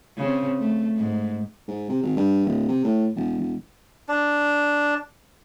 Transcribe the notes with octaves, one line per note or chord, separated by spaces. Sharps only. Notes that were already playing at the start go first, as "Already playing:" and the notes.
C#3 C4
A3
G#2
G#2
C3
G#1
G2
D1
C3
A2
E1
E1
D4